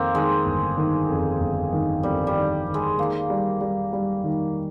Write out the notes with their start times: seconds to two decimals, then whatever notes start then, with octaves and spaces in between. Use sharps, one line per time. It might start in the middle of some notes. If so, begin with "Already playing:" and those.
Already playing: F2 D#3 A#3 C4
0.15 D#3 G#3
0.46 G1
0.77 D#3
1.09 F2
1.40 G1
1.73 D#3
2.03 F2 G3
2.27 G3
2.35 D#3
2.67 D#3
2.74 G#3
2.98 D#3 A#3
3.30 G3
3.61 G3
3.93 G3
4.24 D#3